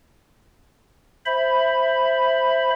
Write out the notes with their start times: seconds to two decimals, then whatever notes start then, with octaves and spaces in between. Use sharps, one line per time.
1.25 C5 E5 B5